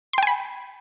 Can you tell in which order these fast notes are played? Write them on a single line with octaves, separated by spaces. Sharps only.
C6 G5 G#5 B5